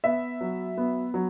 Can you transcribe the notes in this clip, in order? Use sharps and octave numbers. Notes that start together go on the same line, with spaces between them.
B3 E5
F#3
B3
F#3